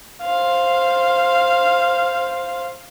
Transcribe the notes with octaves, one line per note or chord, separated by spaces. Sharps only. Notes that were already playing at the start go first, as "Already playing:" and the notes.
C5 F5